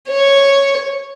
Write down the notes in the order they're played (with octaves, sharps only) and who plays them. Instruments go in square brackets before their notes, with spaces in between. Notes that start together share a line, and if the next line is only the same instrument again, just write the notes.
[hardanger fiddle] C#5